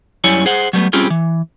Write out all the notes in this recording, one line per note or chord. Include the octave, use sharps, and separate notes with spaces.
F#2 G3 E4 C#5 G#5
G#4 C5 F#5
F#3 G3 A3 B3
G3 C4 C#4 F4 G4 G#4
E3